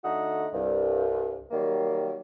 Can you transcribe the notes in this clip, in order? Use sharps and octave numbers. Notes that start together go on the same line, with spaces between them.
D3 A3 D#4 F#4 F#5 D#6
C2 G2
D#3 F#3 G3 A#3